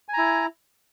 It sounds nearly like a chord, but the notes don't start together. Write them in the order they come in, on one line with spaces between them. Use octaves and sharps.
G#5 A#5 E4